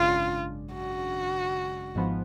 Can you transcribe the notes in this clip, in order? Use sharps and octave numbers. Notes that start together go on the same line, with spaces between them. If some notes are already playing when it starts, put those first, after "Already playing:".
Already playing: G#1 F#2 C#3 G#3 D4 F4
F#4
G#1 G#2 F3 B3